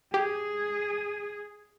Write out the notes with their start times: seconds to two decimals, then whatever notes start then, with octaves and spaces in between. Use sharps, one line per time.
0.14 G4 G#4